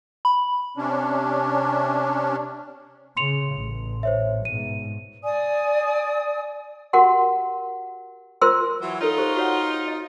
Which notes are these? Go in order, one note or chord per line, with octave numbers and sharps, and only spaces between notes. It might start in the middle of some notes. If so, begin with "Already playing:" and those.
B5
C3 C#4 D4
C#3 C6 C#7 F7
A1
C5 C#5 E5
G#2 B2 D#7
D5 G#5 D#6
F#4 G4 A#4 F#5 C6
F4 A#4 C5 C6 E6
E3 F#3
D#4 F4 A4 A#4 C#5
G4 C5 C#6
F#4 C#5 F#5
D#5